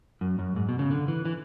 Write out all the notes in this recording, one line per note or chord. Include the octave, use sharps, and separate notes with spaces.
F#2
F#2
G#2
B2
C#3
D3
E3
E3